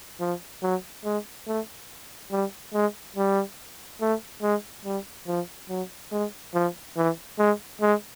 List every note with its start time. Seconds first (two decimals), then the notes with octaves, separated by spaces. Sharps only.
0.20 F3
0.62 F#3
1.05 G#3
1.47 A3
2.31 G3
2.73 G#3
3.16 G3
4.01 A3
4.42 G#3
4.85 G3
5.27 F3
5.69 F#3
6.12 G#3
6.54 F3
6.97 E3
7.39 G#3
7.81 G#3